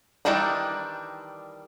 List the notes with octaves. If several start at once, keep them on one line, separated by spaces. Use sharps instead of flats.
D#3 E3 G3 D4 D#4